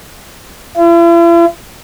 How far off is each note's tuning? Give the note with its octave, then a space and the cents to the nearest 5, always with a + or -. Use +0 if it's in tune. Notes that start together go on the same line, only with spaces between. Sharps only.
E4 +45